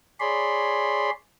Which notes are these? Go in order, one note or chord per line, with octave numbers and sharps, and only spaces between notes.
G#4 C#5 D5 B5 C6